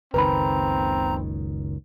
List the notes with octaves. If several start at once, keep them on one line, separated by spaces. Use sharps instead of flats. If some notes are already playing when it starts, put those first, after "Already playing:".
F#1 C#2 D#3 C4 B4 A#5 B5